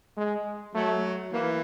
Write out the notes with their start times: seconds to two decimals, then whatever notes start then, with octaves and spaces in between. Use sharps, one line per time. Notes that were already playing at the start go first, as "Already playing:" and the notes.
0.17 G#3
0.75 F#3 A3
1.33 E3 A#3